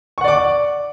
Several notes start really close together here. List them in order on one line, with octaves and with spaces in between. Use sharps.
C#6 F#5 D5 D6